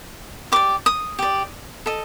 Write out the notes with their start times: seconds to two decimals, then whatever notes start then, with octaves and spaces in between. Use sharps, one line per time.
0.52 G4 D5 D6
0.86 D#6
1.19 G4 D5
1.86 A4 D#5